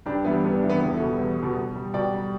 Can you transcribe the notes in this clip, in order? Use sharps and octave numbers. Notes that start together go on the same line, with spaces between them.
G2 D4 G4
E3 G3 B3 E4
G2 B3
D4
E3 G3
B3 E4
E2 B3 E4
E4 A4
B2 G3
E2
B2 G3
B2
G3
B2 D5 G5
G3